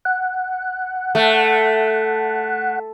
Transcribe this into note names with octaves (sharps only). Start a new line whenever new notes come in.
F#5
A3